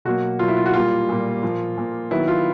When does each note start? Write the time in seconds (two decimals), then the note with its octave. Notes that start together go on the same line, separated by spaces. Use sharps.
0.05 B2 F#3 A#3 F#4
0.39 B2 F#3 A#3 F4
0.48 E4
0.57 F4
0.66 F#4
0.73 A#2 G3 A#3 F4
1.09 A#2 G3 A#3
1.43 A#2 F3 A#3
1.77 A#2 F3 A#3
2.11 D#3 F#3 B3 E4
2.28 F4